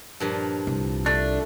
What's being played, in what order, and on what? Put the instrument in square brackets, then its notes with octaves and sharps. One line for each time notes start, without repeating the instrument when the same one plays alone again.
[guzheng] G2 A#2 F3
[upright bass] C2
[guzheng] A3 [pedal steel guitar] D4